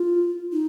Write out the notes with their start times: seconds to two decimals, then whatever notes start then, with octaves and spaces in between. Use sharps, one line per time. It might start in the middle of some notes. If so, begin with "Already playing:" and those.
Already playing: F4
0.52 D#4